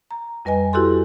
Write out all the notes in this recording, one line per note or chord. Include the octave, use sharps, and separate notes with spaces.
A#5
F2 G3 B4 D#5 G#5
E4 F#4 G4 A4 C6